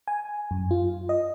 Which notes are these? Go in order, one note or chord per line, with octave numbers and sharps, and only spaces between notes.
G#5
F#2
F4
D#5